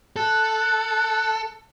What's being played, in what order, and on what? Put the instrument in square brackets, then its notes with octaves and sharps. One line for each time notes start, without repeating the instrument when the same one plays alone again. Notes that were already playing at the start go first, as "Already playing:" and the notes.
[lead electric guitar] A4 [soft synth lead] F#6